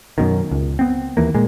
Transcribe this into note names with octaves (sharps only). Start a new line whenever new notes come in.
F#2 B2 D#3
C#2
B3 C4
D#2 E3 A#3
A#2 G#3